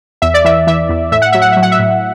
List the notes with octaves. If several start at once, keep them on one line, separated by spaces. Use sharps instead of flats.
E2 E5
D5
E3 E5
E3 E5
E2
A2 E5
F#5
F#3 E5
F#5
F#3 E5
F#5
E5
A2